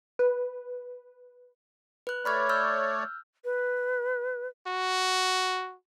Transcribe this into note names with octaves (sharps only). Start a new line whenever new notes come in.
B4
B4 F#6
A3 C#5 D5 B5 F6 G#6
E6 F6 G6
B4
F#4